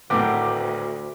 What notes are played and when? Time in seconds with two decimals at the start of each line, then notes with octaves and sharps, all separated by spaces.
0.10 G#1 D2 A2 B3 C4 A#4 D6